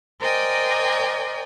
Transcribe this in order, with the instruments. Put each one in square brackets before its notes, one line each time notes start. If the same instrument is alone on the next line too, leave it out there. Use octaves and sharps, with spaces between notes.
[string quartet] A#4 C5 D5 D#5 G5 G#5